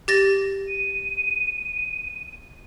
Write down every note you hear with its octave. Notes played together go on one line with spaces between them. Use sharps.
G4 A6 A#6
D#7